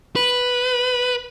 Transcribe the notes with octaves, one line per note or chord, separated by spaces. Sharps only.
B4